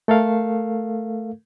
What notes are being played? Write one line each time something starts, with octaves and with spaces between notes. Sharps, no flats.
A3 A4 A#4 F5